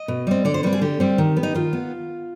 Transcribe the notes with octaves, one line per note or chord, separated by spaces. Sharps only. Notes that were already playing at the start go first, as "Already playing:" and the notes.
Already playing: D#5
B2
G3 C4
D3 D5
C5
G3 C4 B4
G#4
D3 G4
G3 C4
D#3
B3
D#4
D#3 F4
B3